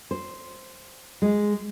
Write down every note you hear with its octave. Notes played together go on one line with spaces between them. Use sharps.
C5
G#3